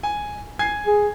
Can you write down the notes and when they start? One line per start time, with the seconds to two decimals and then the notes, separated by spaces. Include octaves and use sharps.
0.03 G#5
0.59 G#5 G#6 C7
0.87 G#4